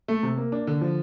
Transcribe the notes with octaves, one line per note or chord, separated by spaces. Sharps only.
A3
C3
A#3
D4
D3
F3